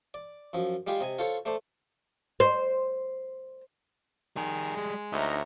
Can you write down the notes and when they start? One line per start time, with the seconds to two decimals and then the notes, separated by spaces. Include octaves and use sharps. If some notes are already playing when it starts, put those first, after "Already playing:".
0.14 D5
0.53 F#2 F3
0.87 G3 G#3 F4 G4 G#4
1.00 C3 D#5 G#5
1.19 F4 A4 C5 C#5
1.45 A3 C5 D5 A5
2.40 C5
4.36 D#3 G3 G#4
4.76 G#3
5.13 D2 D#4 C#5 E5 A#5